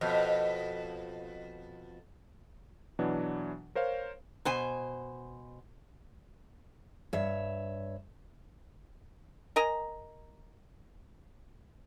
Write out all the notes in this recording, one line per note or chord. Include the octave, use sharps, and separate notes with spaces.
F2 B2
B2 E3 F#3 D4
A#4 C5 C#5 F5
B2 C5 G#5
G2 C#5 E5
A#4 D#5 G#5 A#5